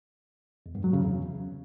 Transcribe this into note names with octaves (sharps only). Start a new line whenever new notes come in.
E2
G2
F#3
C#3
E2